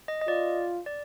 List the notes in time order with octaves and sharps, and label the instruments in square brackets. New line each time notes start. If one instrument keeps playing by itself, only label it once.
[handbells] D#5
D#5
[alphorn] F4 [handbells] D5
[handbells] D5